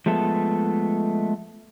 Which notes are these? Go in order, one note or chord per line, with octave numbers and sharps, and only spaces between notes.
F3 G#3 A3 B3 A4